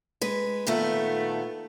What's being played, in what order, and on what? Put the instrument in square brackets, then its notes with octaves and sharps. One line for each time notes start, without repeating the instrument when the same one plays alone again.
[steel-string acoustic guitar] G#3 B4
[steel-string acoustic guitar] A#2 D#3 B3 [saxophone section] A3